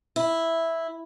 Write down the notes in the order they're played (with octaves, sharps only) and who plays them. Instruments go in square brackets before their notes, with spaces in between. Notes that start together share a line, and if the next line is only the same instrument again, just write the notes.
[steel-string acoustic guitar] E4